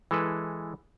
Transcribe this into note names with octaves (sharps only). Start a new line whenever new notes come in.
E3 G#3 A4 B4